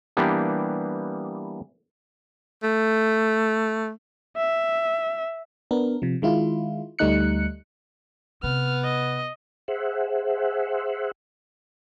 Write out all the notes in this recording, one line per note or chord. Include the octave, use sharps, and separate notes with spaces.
E3 G3 A#3 B3 D4 G4
A3
E5
B3 D4 A#4
C3 F3
D#3 G#3 E4 F4
D2 G3 A3 D#4 F#6 C#7
C3 B3 F6
D#5
G#4 C5 E5 F#5